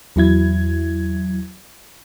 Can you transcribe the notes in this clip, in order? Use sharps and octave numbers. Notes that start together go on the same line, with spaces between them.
E2 F#3 E4 G#6